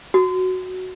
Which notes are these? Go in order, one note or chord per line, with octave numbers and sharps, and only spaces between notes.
F#4